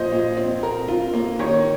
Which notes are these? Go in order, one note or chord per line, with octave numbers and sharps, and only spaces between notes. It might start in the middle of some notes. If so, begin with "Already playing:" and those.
Already playing: A#2 F3 C5 D#5
A#2
C4
A#4
F4
A#3
D#3 C#5